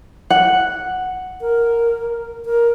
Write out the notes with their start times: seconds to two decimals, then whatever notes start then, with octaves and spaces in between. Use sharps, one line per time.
0.30 F#5
1.41 A#4
2.46 A#4